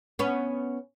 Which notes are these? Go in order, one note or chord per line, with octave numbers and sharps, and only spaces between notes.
B3 C#4